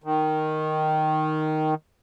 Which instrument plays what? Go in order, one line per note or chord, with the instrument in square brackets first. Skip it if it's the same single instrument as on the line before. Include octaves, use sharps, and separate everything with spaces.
[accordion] D#3